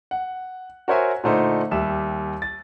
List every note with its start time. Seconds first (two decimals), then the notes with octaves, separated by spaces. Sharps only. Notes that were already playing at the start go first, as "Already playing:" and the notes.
0.11 F#5
0.88 F#4 A#4 C5 C#5 E5 G#5
1.24 A#2 D3 A3 D#4 C5
1.71 D#2 G3 E5 E6 E7
2.42 A6